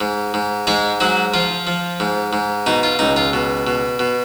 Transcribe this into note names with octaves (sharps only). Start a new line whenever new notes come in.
G#2
G#2
G#2 G#3 G#4
G#2 F#3 F#4
F3 F4
F3
G#2
G#2
B2 D#4
F4
C#2 D#4
F4
B2
B2
B2